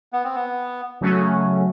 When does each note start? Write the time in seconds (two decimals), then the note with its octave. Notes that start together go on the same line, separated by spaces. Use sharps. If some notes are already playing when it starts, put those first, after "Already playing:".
0.13 B3
0.24 C4
0.35 B3
1.01 C#3 F#3 A3 C#4 F#4